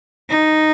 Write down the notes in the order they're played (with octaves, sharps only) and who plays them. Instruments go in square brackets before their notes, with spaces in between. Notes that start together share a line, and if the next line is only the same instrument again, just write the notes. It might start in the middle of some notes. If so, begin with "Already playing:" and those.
[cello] D#4